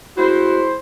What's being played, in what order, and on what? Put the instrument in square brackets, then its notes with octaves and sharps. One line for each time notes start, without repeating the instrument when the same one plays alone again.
[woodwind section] G#3 A3 E4 [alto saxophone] F#4 [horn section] C5